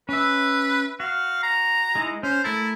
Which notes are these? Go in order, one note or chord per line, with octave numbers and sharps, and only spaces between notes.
C#4 B4 E5
F#4 F5
A#5
G#3 D#4 E4
C#4 C5
A3 E4 A#4 A5